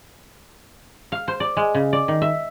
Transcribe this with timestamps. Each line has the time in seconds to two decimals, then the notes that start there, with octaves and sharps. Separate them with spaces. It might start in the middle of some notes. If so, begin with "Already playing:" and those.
1.12 F5
1.28 C5
1.40 D5
1.57 G#3
1.74 C#3
1.93 D5
2.08 D#3
2.22 E5